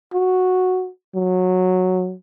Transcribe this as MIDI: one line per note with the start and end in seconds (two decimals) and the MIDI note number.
0.13 0.89 66
1.15 2.14 54